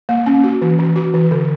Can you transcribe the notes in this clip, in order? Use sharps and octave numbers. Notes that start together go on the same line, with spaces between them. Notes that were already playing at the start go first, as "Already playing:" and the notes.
A#3
C#4
F#4
E3
E3
F#4
E3
D3